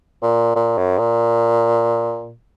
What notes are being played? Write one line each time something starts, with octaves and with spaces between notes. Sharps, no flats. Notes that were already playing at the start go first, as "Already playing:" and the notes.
A#2
A#2
F#2
A#2